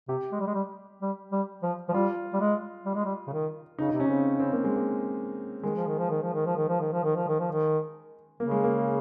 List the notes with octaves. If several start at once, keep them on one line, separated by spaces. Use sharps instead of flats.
C3 G4
G#3
G3
G#3
G3
G3
G3
F3
F3
G3 F4
G3
G#3
G3
G#3
G3
C#3
D#3
C#3 D#4
C3 D#4
C#4
C#3 C4
C4
A#3
G#3
A#3
D#3 G#3
F3
D#3
F3
D#3
F3
D#3
F3
D#3
F3
D#3
F3
D#3
F3
D#3
F3
D#3
C#3 A#3
G#3
A#3